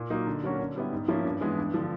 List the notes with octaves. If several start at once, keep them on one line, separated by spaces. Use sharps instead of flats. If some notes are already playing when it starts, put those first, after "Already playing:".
Already playing: A#2
F#3 A#3 D#4
D3
F#3 A#3 C#4 F#4
D3
G3 B3 E4
G#2
F3 A#3 C#4 E4
G2
E3 G#3 B3
G2
D3 F3